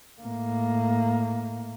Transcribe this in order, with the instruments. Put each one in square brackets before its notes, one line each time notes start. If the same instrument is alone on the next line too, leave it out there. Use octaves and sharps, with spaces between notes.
[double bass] A2 A#3